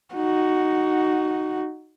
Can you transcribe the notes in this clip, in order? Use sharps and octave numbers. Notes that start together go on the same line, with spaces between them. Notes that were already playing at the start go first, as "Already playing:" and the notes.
D#4 F#4